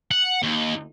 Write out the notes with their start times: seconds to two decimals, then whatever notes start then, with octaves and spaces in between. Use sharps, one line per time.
0.11 F#5
0.43 D#2